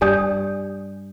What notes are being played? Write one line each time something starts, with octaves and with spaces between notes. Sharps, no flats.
G2 G4 D5 G#5 D#6 G6